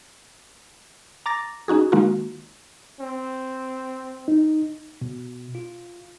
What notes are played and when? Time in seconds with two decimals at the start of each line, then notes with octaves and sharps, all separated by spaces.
1.26 A#5 D6 A6 A#6
1.68 C#4 D#4 F#4 G#4
1.92 D#3 G#3 A#3 D#4 F4 F#4
3.00 C4
4.28 D#4
5.01 B2
5.55 F4